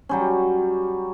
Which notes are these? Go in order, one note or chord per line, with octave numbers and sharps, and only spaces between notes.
F#3 G3 C#4